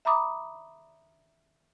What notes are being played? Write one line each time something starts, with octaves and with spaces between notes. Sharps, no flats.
E5 A#5 B5 D6 D#6